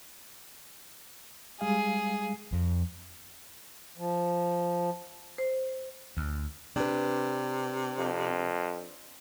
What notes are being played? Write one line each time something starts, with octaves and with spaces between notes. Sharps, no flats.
G3 G#3 G#4 F5
F2
F3
C5
D2
C3 D4 B4
F2